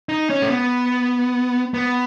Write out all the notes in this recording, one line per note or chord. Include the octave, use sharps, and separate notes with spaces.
D#4
C#4
A3
B3
B3